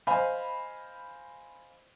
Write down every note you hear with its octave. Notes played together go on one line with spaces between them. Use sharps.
C5 D#5 F5 G#5 B5